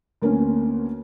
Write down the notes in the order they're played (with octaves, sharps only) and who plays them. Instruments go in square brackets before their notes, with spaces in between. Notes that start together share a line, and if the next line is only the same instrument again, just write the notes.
[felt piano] D2 A#3 B3 C#4